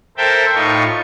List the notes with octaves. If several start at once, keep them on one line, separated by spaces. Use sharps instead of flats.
A4 A#4 C5 E5 G5 A5
A2 D#4 F4 C#6